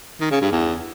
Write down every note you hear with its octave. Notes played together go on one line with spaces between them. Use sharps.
D#3
C#3
G2
E2